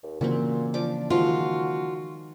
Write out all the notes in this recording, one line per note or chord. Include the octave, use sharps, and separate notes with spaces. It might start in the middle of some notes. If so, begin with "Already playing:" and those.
D#2
A#2 C#3 E3 A#3 C4 E4 F#4
F3 D4 D6
D#3 F3 G#3 F4 F#4